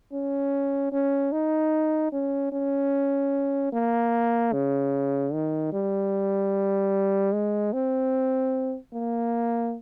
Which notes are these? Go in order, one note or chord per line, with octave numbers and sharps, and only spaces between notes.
C#4
C#4
D#4
C#4
C#4
A#3
C#3
D#3
G3
G#3
C4
A#3